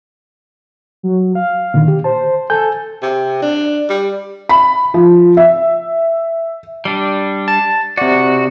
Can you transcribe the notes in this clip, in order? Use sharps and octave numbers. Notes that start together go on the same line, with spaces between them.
F#3
F5
A#2 D3 D#3
G4
C5 A5
A4 G#5 G6
C3
D4
G3
B5
F3
E5
G3 D4
A5
C3 F#4 D5